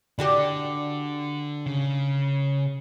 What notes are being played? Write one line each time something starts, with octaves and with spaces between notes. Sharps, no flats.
D3 D4 F#4 G4
C#3